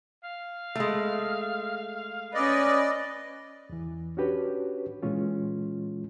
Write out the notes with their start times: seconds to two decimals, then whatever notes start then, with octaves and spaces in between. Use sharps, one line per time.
0.24 F5
0.75 G#3 A3
2.34 C#4 B4 D5 D#5
3.69 E2 E3
4.17 C#4 D4 F#4 G4 B4 C#5
5.02 A#2 E3 G#3 C#4 F4